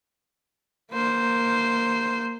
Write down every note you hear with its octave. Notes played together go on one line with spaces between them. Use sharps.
A#3 C5